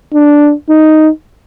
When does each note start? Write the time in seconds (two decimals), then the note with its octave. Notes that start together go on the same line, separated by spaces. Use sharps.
0.14 D4
0.69 D#4